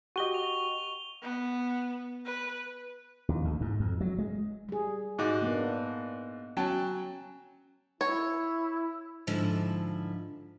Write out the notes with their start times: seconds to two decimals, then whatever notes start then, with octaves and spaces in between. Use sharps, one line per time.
0.16 F#4 G4 D#5 C#6 G7
0.34 F7
1.22 B3
2.26 B4
3.29 D#2
3.45 D2
3.61 G#2
3.80 F2
4.01 F#3
4.18 G#3
4.69 G3 G#4
5.19 G#2 F#4 D6
5.42 A#3 B3 D4
6.57 F#3 C#4 G5 A5
8.01 E4 C#5
9.27 G#2 D3 F3 E4